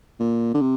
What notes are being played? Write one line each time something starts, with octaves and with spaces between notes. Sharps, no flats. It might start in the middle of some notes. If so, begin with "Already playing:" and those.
A#2
D3
C3